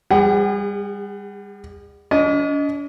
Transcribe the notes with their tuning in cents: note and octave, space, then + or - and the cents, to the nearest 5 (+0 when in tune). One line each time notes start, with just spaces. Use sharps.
G3 +30 G#4 -35 F#5 +30
D4 -45 D#5 +0